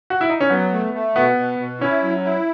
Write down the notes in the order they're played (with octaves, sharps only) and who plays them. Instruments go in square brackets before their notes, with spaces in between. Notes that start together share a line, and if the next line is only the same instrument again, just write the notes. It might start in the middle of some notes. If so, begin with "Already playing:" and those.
[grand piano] F#4
E4
D#4
C#4
[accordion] F#3 [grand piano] B3
[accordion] A3
A3
[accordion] B2 [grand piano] B3
[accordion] B2
B2
[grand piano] C#4 [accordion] E4
[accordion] F#3
E4